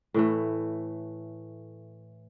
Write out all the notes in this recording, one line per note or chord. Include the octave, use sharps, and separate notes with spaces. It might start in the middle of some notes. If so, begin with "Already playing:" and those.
A2 E3 A3